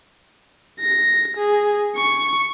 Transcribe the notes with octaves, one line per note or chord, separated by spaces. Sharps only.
A#6
G#4
C#6